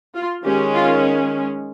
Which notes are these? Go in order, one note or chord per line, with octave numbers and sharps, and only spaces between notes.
F4
D#3 G#3 C#4 G4
F4